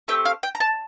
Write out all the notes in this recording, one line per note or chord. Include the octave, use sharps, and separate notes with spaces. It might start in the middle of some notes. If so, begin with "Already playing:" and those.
A3 C4 G4 G5
F5
G5
A#5
A5